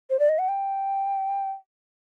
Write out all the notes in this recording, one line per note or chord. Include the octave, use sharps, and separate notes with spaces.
C5
D5
D#5
F#5
G5